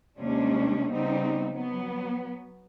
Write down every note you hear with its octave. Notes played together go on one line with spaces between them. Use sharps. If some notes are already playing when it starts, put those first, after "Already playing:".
D#2 C3 G3 G#3 C#4 D4
C#3 G3 B3 C4 D#4
F#3 B3